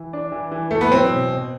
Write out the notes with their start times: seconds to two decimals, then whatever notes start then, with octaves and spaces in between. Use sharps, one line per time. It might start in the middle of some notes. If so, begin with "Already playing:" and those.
Already playing: E3
0.13 D4
0.32 E3
0.52 E3
0.71 E3 A3
0.81 B3
0.92 F#3 C4
1.10 B2
1.30 B2